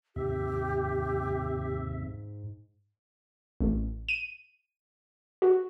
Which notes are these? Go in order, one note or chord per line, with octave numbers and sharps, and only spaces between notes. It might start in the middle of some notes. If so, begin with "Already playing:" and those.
D#2 G#2 C3 G4 E5
A1
D#7
F#4